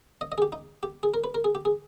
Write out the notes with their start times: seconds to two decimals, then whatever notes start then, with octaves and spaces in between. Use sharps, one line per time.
0.21 D#5
0.32 D#5
0.38 G#4
0.42 G4
0.52 D#4
0.83 G4
1.03 G#4
1.14 A#4
1.24 B4
1.35 A#4
1.44 G#4
1.55 G4
1.65 G#4